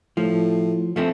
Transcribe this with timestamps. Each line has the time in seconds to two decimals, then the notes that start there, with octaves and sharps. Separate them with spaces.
0.17 A2 F3
0.96 F3 A3 C4